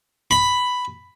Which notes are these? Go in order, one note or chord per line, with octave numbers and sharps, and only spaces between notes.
B5